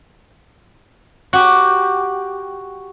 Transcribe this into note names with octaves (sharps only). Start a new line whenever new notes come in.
F#4 G4